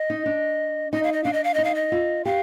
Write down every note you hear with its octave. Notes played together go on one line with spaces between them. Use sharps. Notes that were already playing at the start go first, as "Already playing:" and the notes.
Already playing: D#5
D#4
D4
D#4 D#5
F5
D#5
D4 F5
D#5
F5
D#4 D#5
F5
D#5
F4
G4 F5